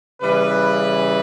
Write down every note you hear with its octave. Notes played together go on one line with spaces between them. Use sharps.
C#3 E3 G3 B4